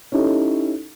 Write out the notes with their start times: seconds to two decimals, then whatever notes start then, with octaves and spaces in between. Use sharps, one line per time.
0.12 C#4 D#4 E4 G4 A4